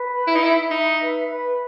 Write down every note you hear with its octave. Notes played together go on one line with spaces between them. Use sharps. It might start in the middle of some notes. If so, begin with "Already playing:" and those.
Already playing: B4
B5
E4
D#4
E4 E5
D#4 E5
B4
B4